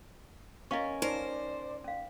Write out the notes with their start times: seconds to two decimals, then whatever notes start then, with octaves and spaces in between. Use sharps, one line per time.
0.71 C#4 A#4 D#5 F5 C#6
1.02 D#4 A#4 C5 D5 A5 A#5
1.84 C#4 F5